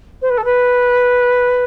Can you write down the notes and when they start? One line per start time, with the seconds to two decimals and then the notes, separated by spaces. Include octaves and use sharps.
0.21 C5
0.29 B4
0.37 A4
0.44 B4